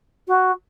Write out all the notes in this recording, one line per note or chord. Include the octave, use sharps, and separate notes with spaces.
F#4